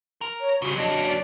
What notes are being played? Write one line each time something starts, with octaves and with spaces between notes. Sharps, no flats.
A#4
C#5
C#3 G3 F#4
F#3 D4 D#5
D5